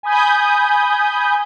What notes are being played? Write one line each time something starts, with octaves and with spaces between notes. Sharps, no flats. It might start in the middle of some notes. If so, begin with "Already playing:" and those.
G#5 B5 D#6 G6